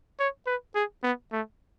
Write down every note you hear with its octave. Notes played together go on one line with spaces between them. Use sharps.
C#5
B4
G#4
B3
A3